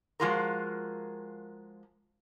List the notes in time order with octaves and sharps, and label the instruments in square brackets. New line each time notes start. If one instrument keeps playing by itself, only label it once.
[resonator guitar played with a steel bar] F3 G#3 A#3 F4 F#4 A#4